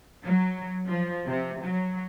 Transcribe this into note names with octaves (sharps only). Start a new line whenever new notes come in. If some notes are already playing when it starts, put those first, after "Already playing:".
F#3
F3
C3
F#3